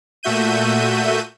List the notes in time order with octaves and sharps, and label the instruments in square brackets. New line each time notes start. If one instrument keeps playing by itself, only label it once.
[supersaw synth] A#2 A3 F#4 E5 G6 D#7